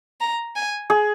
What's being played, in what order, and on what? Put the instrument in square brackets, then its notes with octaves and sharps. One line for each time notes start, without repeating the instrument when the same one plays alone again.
[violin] A#5
G#5
[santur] G#4